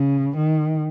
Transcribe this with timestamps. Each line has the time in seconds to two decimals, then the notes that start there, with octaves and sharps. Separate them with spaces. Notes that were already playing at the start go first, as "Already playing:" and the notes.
Already playing: C#3
0.37 D#3